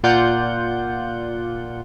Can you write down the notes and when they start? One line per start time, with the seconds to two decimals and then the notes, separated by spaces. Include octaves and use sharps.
0.03 A#2 F4 D5 F#5 G6